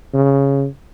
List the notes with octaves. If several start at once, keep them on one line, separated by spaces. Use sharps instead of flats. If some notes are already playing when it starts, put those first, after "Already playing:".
C#3